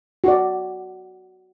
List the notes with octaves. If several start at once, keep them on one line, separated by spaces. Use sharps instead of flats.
F#4 D5